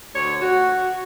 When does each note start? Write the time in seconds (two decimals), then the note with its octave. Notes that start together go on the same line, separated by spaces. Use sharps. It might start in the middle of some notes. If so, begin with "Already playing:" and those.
0.14 D2 C#5
0.41 F#4